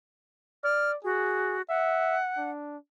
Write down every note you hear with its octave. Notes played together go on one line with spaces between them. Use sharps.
D5 F6
F#4 G#4
E5 F#5
D4